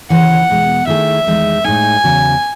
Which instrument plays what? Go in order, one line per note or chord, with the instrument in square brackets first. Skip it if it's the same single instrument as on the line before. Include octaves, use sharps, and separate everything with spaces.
[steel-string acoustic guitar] D#2 C#3 E3 [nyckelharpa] F#5
[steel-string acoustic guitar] E2 B2 G#3
[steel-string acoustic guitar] D#3 A3 E4 G#4 [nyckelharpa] E5
[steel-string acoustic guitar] E2 D#3 G#3 D#4
[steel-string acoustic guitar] A2 G#3 D#4 [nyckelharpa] G#5
[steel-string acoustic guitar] E2 C#3 F#3